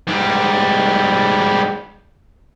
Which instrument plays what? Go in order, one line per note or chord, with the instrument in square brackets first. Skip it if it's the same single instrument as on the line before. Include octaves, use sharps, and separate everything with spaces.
[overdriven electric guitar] G#2 G3